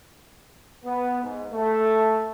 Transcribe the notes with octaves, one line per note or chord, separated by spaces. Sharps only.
B3
G#2
A3